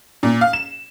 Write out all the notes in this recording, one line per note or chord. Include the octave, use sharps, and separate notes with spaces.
A#2
F5
E7